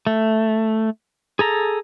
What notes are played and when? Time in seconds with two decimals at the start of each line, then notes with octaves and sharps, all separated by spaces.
0.07 A3
1.39 G#4 A4 A#5